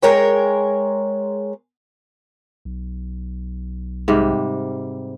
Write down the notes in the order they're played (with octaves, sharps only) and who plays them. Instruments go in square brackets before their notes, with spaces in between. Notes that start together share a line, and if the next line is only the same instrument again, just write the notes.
[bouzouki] G#3 A#4 C#5 G5
[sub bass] B1
[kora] G#2 C3 G3